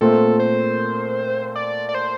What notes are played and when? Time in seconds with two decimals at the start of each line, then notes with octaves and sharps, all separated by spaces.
0.01 A#2 A3 C4 A4
0.40 C5
1.55 D5
1.89 D5
1.95 C5